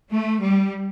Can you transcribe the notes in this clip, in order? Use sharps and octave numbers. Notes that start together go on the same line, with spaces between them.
A3
G3